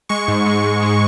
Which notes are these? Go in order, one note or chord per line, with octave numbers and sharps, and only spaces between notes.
G#3 C#6
G#2
G#3
G#2
G#3